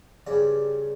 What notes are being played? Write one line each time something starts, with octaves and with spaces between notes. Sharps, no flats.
G2 C#3 D5